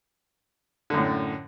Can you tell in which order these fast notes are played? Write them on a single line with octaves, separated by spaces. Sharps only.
D3 F#2 A2